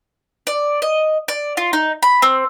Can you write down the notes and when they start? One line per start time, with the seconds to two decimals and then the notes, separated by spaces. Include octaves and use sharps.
0.47 D5
0.82 D#5
1.28 D5
1.57 F4
1.73 D#4
2.03 B5
2.22 C4